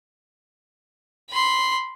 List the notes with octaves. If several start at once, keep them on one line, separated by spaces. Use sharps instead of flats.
B5 C6